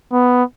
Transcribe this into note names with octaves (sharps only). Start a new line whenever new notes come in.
B3